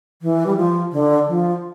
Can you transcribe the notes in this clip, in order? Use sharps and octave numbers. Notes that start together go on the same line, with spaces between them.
E3
G3
F3
D3
F3